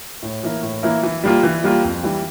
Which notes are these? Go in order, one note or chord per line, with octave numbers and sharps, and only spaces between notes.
A2
E3 A#3 E4 A#4
A2
E3 A#3 E4 A#4
E3
G3 A#3 F4
E3
G3 A#3 F4
F2
E3 G3